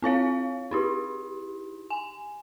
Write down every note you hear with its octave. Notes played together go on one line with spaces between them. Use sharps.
C4 F4 C#5 F5
D#4 E4 G4
G#5